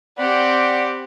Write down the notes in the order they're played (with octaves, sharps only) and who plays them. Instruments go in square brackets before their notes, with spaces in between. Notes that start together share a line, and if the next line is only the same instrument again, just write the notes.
[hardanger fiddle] C4 G4 [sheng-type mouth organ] D5 F#5 B5